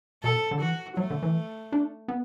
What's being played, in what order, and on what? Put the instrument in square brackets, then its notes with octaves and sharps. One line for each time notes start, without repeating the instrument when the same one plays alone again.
[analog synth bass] B2 [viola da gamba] A4
[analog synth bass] D3
[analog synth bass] E3 [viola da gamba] F#4
[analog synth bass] F#3 [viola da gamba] A3
[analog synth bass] D3
E3
D4
B3